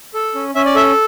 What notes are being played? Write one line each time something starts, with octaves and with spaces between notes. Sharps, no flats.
A4
C#4
C#4 E5
D5
A4 E5